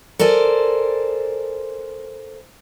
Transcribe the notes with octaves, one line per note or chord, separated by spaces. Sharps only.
A4 A#4 C5 D5 G#5